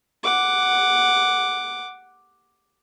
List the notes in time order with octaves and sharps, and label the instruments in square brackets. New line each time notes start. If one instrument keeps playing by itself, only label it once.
[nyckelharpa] F#5 D6